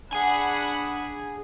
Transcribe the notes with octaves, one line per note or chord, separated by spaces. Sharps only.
D4 G#4 F#5 G#5 B5